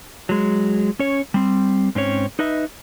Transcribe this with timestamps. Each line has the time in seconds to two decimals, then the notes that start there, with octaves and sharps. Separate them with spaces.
0.29 F#3 G#3
0.99 C#4 C#5
1.34 G3 C4
1.95 G#2 C4 C#4 C#5
2.39 D#4 B4 D#5 E5